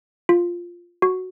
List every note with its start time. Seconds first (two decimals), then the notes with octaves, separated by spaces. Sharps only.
0.29 F4
1.02 F#4